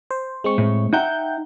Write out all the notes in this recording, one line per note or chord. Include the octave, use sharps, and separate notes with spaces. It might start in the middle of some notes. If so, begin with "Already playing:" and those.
C5
G#3 C4 C#6
A2
D#4 E5 F#5 G5 A#5 G6